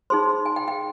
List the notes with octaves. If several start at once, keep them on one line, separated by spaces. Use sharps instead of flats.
D#4 G#4 C5 C6
G#5
G5
G5